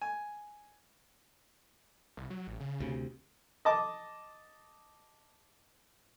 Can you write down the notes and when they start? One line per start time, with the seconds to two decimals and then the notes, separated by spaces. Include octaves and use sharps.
0.02 G#5
2.17 C2
2.30 F#3
2.47 A1
2.60 C#3
2.80 D2 C3
3.65 D#5 A5 D6